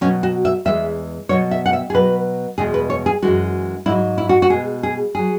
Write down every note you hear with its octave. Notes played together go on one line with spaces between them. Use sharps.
B2 F#3 C#4
F#4
E5
E2 E3 G#3 E5
B2 F#3 C#5
E5
F#5
E5
G#4
B2 F#3 B4
E2 B2 G#3 G#4
B4
C#5
G#4
F#2 E3 G#3 F#4
G#2 F#3 E4
E4
F#4
F#4
B2 G#3 G#4
G#4
F#3 G#4